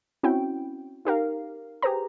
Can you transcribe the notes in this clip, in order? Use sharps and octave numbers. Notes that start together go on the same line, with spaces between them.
C4 C#4 E4 F#4 G5
D#4 G4 A#4 F5
G4 G#4 B4 C5 A#5